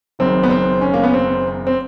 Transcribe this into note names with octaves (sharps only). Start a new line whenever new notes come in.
F#1 F#2 D#3 C4
B3
C4
C#4
A#3
B3
C4
C4